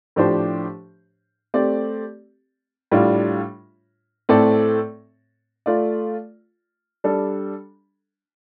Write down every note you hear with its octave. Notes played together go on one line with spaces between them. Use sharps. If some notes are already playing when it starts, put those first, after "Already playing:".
A2 F3 D4 G4 C5
A3 C4 G4 D5
A2 G3 D4 F4
A2 A3 C4 A4 D5
A3 F4 D5
G3 D4 A4